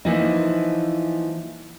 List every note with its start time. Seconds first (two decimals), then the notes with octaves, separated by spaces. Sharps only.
0.05 E3 F3 A#3 D#4